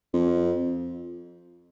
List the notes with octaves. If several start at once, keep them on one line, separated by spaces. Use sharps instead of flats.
F2